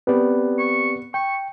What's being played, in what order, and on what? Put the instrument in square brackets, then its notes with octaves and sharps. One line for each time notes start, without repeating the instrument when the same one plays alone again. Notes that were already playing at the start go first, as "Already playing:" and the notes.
[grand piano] B3 [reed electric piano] C4 G4 D5
[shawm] C#6
[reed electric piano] G5 [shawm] C#6